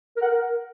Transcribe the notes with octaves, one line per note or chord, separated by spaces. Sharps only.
A#4
F#5
A#4